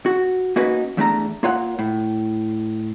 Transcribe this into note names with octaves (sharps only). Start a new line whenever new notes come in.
F#4
A#3 C#4 D#4 F#4 B4
E2 A3 D4 A#5
A#3 F4 C#5 F#5
A2